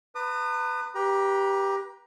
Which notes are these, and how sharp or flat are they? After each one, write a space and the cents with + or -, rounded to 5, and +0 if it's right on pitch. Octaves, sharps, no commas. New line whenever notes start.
B4 +15 A#5 -45 D#6 -35
G4 +5 B4 -20 A#5 +25